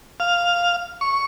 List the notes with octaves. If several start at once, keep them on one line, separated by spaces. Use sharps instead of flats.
F5
C#6